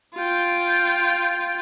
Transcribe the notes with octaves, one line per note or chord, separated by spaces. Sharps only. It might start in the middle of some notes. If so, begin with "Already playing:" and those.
F4 G5